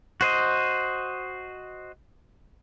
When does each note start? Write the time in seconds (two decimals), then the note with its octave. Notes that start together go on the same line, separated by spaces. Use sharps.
0.21 F#4 C5 D#5